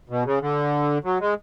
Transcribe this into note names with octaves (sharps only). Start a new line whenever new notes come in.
B2
C#3
D3
F#3
G#3